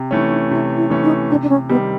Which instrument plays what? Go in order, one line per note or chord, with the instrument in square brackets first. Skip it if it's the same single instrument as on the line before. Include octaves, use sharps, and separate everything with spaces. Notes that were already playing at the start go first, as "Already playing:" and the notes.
Already playing: [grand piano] C3
[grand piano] E3 A3 C#4 [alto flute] D#4
[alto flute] D#4
[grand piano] C3 [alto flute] E4
[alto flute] E4
[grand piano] E3 A3 C#4
[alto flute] D#4
[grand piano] C3 [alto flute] D4
[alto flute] D4
C#4
[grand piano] D#3 G3 C4 [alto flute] B3